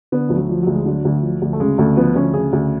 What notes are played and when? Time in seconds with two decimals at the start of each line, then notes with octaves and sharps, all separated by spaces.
0.12 D3 B3
0.29 D2 F3
0.36 F#3
0.49 F3
0.62 F#3
0.67 D2
0.75 G#3
0.85 D3 F#3
1.05 D2
1.22 F3
1.42 D2
1.53 A3
1.60 C#3 G#3
1.78 D2 A3
1.97 F3 B3
2.15 D2 C#4
2.33 C#3 G#4
2.53 D2